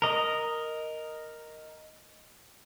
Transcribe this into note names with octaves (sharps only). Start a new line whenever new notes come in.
A#4 D#5